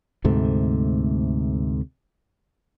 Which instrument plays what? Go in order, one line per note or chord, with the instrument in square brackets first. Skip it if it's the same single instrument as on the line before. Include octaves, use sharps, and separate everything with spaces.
[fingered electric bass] D2 G#2 C3 A3